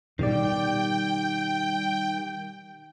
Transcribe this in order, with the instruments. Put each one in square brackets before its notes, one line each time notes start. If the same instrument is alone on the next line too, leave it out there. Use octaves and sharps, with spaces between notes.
[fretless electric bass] B2 [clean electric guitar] D#3 G3 D5 [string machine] G5